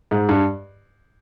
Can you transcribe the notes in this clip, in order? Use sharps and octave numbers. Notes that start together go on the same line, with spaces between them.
G#2
G2